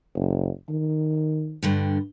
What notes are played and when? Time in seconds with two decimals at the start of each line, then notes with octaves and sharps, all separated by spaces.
0.16 F#1
0.69 D#3
1.63 G2 D3 G3